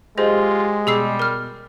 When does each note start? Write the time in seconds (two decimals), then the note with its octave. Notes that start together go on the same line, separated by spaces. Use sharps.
0.18 G#3 F4 G4 G#4 C5 D#5
0.87 B2 G3 G#4 E6 C7
1.20 A#4 F6